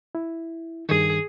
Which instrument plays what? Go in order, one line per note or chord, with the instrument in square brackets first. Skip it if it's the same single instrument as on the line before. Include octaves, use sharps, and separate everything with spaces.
[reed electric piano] E4
[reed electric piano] G2 D#3 [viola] G#4